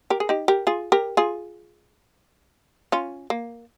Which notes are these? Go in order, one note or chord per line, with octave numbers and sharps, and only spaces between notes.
G4 A#4
G#4
D#4 G4
G4 A#4
F4 G#4
G4 A#4
F4 G#4
C#4 F4
A#3